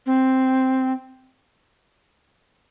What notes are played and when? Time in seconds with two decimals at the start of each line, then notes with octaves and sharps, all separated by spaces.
0.06 C4